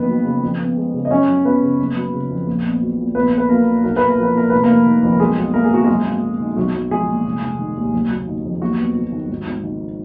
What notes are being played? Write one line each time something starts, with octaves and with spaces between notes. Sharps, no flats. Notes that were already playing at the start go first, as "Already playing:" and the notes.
Already playing: F2 D#3 A#3 B3 B4
F#3
C#3
F2
B3
G#3
C#3
D#5
F#2 C#4 C#5
F#2
F#3 B3 B4
C#3
F#1
F#3
C#3
F2
A#1
B3
F#3
A#2
A#1 B3 B4
B3
B4
F#3 A#3 A#4
A#2
B1 A#4
A#3 B4
A#4
F3
B4
A#2 A#4
F1 B4
A#3 A#4
F1
D#3
F2
A#4
B1 G#3 G#4
B1
A#3 A#4
G#4
B2 F#4
F#2 G#3 G#4
A#3
F#3
D#3
B1 F#3 F#4
B1
F3 G#3 G#4
A#2
F1
F1
D#3
D#2
F#1
F#3
D#3
F2
D#2 F#3 F#4
B3
F#3
D#3
G#1
G#1
D#3